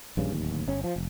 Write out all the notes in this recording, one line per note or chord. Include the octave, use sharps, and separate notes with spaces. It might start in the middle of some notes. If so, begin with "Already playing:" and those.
A#1 G2 C#3
D1 D#2
G1 C#4
F3
F1